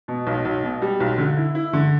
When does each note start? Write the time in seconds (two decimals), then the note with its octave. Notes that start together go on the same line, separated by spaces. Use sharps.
0.08 B2
0.27 B1
0.45 B1
0.63 B2
0.82 G3
1.00 B1
1.18 D3
1.37 E4
1.55 E4
1.73 D3